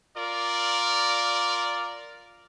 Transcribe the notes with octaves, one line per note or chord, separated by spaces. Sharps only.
F4 A#4 D5